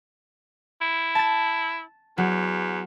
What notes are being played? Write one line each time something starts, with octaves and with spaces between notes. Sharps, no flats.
E4
A5 A6
E2 F#3 F#4